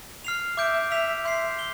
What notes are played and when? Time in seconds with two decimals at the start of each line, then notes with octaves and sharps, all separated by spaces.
0.24 F6 C7 F7
0.57 E5 D6 G6 D7
0.91 E5 E6 B6 F7
1.25 E5 C6 G6 C7
1.59 G7